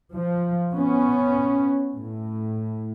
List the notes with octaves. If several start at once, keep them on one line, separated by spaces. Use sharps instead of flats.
F3
B3 C#4
A2